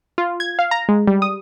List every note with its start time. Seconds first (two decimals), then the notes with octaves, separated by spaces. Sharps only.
0.18 F4
0.40 G#6
0.59 F5
0.71 A#5
0.89 G#3
1.07 G3
1.22 D#6